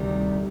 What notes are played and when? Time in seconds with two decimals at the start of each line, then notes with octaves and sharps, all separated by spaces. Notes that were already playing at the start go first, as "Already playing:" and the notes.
Already playing: D2 C3 D#3 G3